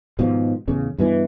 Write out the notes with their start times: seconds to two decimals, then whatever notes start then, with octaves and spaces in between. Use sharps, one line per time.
0.19 G#2 B2 D#3 F3
0.68 A1 E2 C#3
0.98 G2 B2 E3